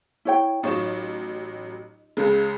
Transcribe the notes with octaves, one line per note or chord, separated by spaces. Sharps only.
E4 C#5 G5
A1 F#3 D#4 F4 C#5 E7
C#2 C#3 G#3